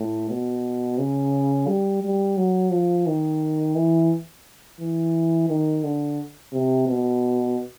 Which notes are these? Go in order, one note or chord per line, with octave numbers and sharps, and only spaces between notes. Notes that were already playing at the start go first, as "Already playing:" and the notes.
Already playing: A2
B2
C#3
G3
G3
F#3
F3
D#3
E3
E3
D#3
D3
C3
B2